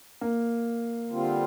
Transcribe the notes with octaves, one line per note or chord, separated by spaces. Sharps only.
A#3
D3 G3 C4 F4